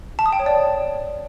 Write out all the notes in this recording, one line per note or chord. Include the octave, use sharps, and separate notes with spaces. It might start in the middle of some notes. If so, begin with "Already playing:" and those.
A5
D#6
G5
C#5
D5